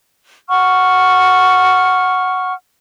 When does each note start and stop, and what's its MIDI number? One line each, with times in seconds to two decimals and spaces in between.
0.49 2.53 78
0.49 2.53 85
0.49 2.53 89